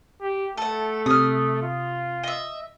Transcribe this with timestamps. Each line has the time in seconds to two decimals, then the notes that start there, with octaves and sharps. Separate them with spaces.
0.22 G4
0.57 A3 A4 F#5
1.06 C3 D#6 F6
1.62 F4
2.23 D#5 E5